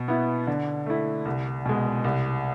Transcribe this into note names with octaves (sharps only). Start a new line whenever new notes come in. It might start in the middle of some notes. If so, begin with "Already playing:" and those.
Already playing: B2
B3 E4
D3
A3 E4
C2
B2 G#3
C2